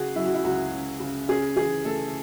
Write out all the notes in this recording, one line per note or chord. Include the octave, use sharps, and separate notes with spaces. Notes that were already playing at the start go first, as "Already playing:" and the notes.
Already playing: C#3 C#4 F#4 G#4
F#3 E4
F#4
E4
C#2 F#4
C#4
C#3
C#4 G#4
E3 G#4
A3 A4